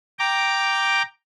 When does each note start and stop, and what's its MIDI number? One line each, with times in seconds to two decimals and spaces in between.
0.19 1.02 79
0.19 1.02 82
0.19 1.02 86